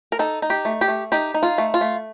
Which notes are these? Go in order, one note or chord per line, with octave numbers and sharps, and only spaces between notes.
A#4
D#4 A4
D#4
G4
A3
G4
A3
D#4 G4
D#4
F4
A3
F4
A3